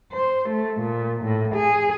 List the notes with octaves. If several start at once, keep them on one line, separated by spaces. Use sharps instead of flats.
C5
A3
A#2
A2
G#4